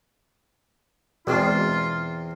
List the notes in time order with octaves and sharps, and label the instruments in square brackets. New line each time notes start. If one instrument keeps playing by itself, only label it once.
[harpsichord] E2 C4 [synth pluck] B2 G#3 D4 [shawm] F4